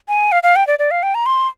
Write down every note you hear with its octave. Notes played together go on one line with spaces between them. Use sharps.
G#5
F5
F5
G5
D5
D5
F5
G5
A#5
C6